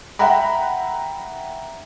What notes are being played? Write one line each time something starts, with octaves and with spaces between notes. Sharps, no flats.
E5 F#5 G5 A#5 B5